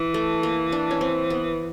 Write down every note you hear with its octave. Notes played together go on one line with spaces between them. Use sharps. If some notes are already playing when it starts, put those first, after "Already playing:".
Already playing: E3
A3
A#3
D4
C#4
C4
B3